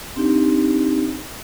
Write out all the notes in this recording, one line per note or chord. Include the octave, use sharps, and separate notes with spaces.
C4 D4 D#4 G4